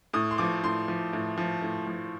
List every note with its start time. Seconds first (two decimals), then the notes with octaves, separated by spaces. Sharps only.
0.13 A2 D#6
0.31 C6
0.38 F3 D6
0.63 A2 C6
0.88 F3
1.13 A2
1.38 F3
1.62 A2
1.87 F3